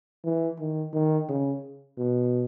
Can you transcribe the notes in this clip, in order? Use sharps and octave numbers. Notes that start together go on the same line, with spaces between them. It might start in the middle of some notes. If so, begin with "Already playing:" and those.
E3
D#3
D#3
C#3
B2